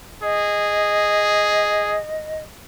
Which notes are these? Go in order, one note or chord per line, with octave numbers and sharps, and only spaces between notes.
G#4 D#5